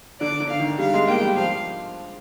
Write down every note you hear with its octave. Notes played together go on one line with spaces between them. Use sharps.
D3 D5
D3
F5
D#3
G3 F5
G#3
A#3 G5
G3
F3 F5